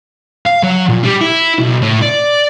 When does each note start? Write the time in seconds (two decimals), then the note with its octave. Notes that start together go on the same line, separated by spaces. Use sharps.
0.47 F5
0.64 F#3
0.89 A#2
1.04 G3
1.21 E4
1.59 B1
1.82 A2
2.02 D5